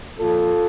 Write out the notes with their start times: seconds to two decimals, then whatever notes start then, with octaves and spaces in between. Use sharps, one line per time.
0.19 A#2 F3 F4 A4